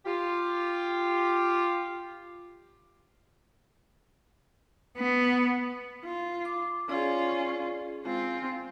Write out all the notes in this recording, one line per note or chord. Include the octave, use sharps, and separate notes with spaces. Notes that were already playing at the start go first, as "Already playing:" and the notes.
F4 G4
B3
F4
D6
C#4 F4 G#4 D5
G#3 C4 F4